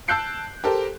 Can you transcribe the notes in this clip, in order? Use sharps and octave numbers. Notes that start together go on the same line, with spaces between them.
A5 E6 F#6 G6 C7 D7
G4 A4 A#4 C5